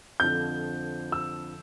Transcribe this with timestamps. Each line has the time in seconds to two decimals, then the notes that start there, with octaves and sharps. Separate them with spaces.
0.20 F2 D3 F3 G6
1.12 E6